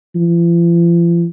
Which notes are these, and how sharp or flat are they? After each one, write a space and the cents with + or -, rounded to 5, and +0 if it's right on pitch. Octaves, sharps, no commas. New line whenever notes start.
F3 -45